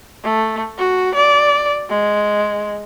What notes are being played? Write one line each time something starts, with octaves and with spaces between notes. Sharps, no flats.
A3
F#4
D5
G#3